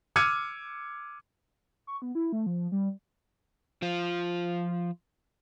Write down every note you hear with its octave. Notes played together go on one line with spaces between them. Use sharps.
D6 E6 F6 G#6 C#7 D#7
C#6
B3
E4
A3
F3
G3
F3 F4